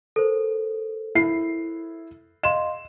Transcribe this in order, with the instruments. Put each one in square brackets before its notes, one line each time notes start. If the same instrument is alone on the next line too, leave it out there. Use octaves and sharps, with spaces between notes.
[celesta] A4 A#4 C5
[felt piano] E4 C7
[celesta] D#5 F5 C6 [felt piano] E7